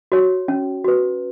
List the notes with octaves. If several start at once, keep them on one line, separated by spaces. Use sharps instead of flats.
F#4 C#5
C#4
F#4 B4